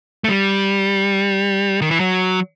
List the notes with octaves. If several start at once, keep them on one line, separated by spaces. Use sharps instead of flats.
A3
G3
D#3
E3
F#3